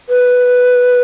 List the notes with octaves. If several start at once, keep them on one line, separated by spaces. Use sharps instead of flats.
B4